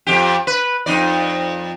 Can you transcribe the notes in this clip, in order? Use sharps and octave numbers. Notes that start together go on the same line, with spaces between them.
F2 G4
B4
F2 D#4 D5